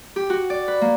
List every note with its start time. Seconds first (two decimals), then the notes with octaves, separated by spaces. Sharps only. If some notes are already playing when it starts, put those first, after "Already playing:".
0.16 G4
0.30 F#4
0.50 D5
0.68 B4
0.81 A#3